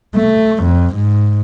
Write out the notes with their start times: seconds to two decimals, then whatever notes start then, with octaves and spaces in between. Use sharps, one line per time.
0.16 A3
0.64 F2
0.96 G#2